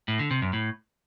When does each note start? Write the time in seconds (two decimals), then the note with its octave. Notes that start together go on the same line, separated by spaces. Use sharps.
0.08 A2
0.19 D3
0.31 C3
0.42 F#2
0.53 A2